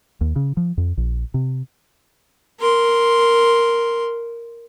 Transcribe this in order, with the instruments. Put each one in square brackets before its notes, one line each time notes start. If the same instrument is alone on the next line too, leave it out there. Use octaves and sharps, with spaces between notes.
[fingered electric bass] D#2
C#3
F3
F2
A#1
C3
[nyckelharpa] A#4 C6